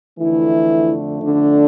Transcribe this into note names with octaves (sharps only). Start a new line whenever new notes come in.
F2 D3 E3 A3 E4
D3 D4